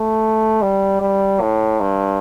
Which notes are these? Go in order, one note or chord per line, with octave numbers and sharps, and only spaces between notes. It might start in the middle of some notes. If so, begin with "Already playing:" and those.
Already playing: A3
G3
G3
A2
G2